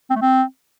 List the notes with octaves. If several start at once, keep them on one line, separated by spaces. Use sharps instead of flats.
C4
A3
C4